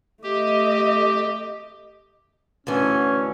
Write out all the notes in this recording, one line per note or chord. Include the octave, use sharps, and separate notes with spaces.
A3 G4 D#5
D2 D3 E3 C#4